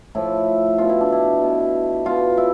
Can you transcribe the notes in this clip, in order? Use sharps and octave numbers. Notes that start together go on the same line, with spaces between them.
A2 F3 E4
B2 F4
E4
D4
E4
B2
B2 F4
E4